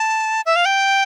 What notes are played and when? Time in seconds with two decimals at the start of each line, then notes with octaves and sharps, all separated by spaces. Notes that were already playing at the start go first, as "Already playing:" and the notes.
Already playing: A5
0.46 E5
0.56 F5
0.65 G5